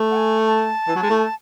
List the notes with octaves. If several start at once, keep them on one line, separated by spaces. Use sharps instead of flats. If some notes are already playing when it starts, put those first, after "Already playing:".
Already playing: A3
F#5
G#5
A5
E3
F#3
G#3
A3